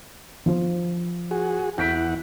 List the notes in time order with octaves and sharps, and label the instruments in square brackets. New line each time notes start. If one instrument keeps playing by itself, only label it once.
[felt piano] F3 F4
[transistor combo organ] F#4 G#4
[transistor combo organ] E2 E4 F#5 [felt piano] G6 B6 D7